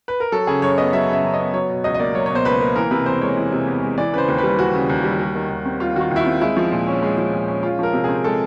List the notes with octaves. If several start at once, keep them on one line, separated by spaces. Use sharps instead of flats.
B4
A#4
F#3 A4
C#3 G#4
F#2 C#5
B3 D#5
F#3 E5
C#3 E5
F#2
D#5
B3
F#3 C#5
B2
C#2 D#5
D#5
A#3 D5
F#3 C#5
B2 C#5
C5
C#2 B4
A#3
E3 A#4
C3 B4
E2 C5
G#3 C#5
E3
C3
E2
G#3
E3 D5
C#3 B4
C5
D#2
G3 B4
E3 F#4
C#3
D#2
G3
G3
D#3
D#2
C4
G3 F4
D#3 F#4
F4
D#2 E4
F4
C4
G#3 E4
F3
A#2
C#4
G#3
F3
A#2
C#4
G#3 F4
F3 A#4
C3
C4 G#4
G#3 A4